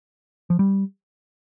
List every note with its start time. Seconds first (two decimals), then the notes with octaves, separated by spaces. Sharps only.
0.50 F3
0.59 G3